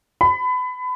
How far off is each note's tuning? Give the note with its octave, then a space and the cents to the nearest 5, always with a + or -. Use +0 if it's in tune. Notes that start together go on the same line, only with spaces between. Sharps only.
B5 +25